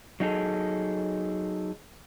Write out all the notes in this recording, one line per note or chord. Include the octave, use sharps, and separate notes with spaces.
F#3 D#4 G#4 A4